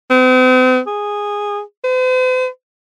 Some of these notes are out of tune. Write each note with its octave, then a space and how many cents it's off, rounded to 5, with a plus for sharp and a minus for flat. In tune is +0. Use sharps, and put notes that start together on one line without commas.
C4 -45
G#4 -10
C5 -45